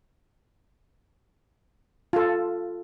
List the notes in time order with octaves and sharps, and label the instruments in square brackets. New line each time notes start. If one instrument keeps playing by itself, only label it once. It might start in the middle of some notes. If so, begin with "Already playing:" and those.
[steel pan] F4 A4